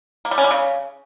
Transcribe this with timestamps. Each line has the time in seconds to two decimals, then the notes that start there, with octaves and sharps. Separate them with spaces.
0.25 A#3
0.31 G3
0.38 C#4
0.44 G3
0.51 C#3